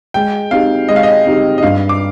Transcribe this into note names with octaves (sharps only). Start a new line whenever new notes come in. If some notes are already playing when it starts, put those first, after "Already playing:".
G#3 G5
C4 D#4 G4 F5
G#3 D#5
F5
D#5
C4 D#4 G4
D#5
G2 F5
D6